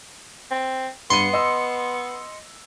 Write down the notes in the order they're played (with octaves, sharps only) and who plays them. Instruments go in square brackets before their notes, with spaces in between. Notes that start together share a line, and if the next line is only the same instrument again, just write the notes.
[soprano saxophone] C4
[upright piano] G2 B5 D#7 [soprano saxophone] B3 [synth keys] C6 C#7
[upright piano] D#5 E6